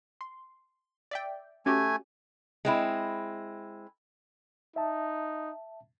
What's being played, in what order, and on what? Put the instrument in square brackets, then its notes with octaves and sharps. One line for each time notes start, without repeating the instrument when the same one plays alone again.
[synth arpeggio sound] C6
D5 E5 G5
[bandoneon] A3 G#5 [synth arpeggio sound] C#4 F#4 G4
[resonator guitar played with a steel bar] G#3 C4 E4
[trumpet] D#4 [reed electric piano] E5 A5